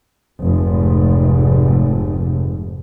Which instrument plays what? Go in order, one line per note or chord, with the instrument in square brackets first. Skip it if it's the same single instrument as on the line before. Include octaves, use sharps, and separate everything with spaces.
[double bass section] F1 G#2